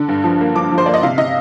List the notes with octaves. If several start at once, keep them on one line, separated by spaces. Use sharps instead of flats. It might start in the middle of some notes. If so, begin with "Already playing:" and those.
Already playing: D3
G2
F3
A#3
F3 D6
F3
C5
A#3 D5
D#5
C3 F5
C3 D#5